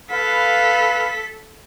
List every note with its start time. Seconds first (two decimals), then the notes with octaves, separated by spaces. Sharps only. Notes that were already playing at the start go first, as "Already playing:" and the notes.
0.11 A4 B4 F5 B6